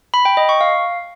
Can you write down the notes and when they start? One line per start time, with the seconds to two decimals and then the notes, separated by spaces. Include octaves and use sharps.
0.14 B5
0.25 G5
0.37 D#5
0.49 C#6
0.61 F5